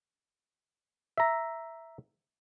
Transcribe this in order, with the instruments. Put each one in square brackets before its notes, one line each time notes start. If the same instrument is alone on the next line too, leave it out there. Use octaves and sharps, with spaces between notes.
[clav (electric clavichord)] E5 A#5